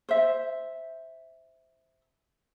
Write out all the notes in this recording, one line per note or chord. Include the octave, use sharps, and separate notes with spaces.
C5 E5